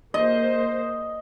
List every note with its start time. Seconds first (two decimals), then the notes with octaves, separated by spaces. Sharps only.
0.14 A#3 C5 D#5